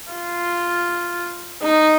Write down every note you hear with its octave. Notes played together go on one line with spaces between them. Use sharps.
F4
D#4